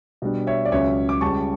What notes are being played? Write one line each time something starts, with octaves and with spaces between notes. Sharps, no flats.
B2 G3 D4
C#5 E5
D5
C#2 C#3 F#3 C#4 C#5 E5
D6
C#2 C#3 G3 A5 C#6